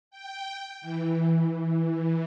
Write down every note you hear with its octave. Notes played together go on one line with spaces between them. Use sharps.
G5
E3